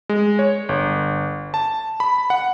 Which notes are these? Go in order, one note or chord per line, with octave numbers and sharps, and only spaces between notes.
G#3
C#5
G1
A5
B5
F#5